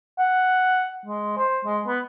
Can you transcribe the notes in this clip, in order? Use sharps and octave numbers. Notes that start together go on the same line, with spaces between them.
F#5
G#3
C5
G#3
B3